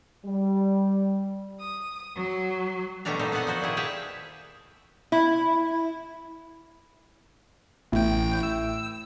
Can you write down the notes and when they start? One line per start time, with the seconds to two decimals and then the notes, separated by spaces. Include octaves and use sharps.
0.26 G3
1.59 D#6
2.17 F#3
3.05 B2 G3 A3 C#4 D4 A#5
3.19 A#2 A3 D#4 C5
3.32 B3 D#4 A4 F#5 G#5
3.47 F3 F#4 C5
3.61 A#2 D#3 E4 G#4
3.77 G4 G#4 E5 F5 G5 A5
5.12 E4
7.92 A1 A2 G5
8.43 E6